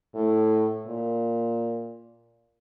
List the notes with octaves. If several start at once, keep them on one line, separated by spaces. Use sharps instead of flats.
A2
A#2